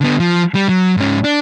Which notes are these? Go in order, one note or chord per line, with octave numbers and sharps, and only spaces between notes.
D3 B3
F3
G3
F#3
G#2 C#4
D4